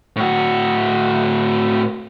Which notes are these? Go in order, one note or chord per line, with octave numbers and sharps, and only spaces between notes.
A2 F#4